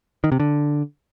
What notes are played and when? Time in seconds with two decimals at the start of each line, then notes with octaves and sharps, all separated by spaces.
0.24 D#3
0.32 C3
0.40 D3